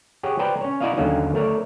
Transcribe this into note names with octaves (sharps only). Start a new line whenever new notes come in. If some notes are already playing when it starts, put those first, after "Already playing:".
G4 G#4 C#5 F#5
B4 C5 D5 G5 A#5
C#4 C#5
E4 F#4 D5 D#5 F5
D#2 D3 F#3 A#3 C#4 D#4
A3 A#4 C#5 D5